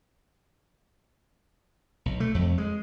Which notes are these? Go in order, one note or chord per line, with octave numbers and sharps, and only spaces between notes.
B1
A3
F2
G#3